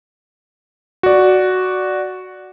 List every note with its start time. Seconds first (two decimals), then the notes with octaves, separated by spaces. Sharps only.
1.03 F#4 D5